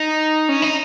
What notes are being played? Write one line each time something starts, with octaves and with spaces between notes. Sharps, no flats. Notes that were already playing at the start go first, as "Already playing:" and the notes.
Already playing: D#4
C#4
D#4